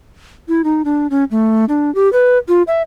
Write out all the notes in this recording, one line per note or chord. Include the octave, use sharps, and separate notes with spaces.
E4
D#4
D4
C#4
A3
D4
G4
B4
F4
E5